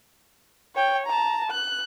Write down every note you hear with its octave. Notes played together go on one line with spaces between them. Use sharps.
C#5 G5
A5 A#5
F#6